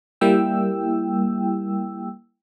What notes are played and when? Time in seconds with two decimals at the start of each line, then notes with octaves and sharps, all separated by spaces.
0.21 G3 A#3 E4 G5 E6